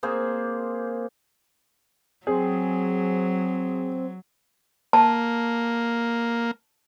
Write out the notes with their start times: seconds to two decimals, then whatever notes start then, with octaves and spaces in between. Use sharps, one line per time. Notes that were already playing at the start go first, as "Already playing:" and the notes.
0.03 A#3 C4 G#4 C5
2.27 F#3 C4 G#4
4.93 A#3 A5